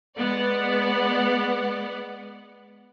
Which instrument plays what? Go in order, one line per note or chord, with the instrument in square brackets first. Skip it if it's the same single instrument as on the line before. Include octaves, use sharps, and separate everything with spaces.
[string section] G#3 B3 D5 F#5